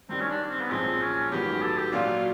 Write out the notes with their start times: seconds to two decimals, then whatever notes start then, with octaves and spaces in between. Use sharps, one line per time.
0.09 G2 D#3 G3 C4
0.20 C#4
0.30 D4
0.50 C4
0.61 B3
0.70 B1 A#2 F3 G#3 C4
1.02 C#4
1.31 A1 G#2 D#3 F#3 B3 G4
1.62 A4
1.77 G4
1.92 A#2 F#3 A#3 D4 F4 F#4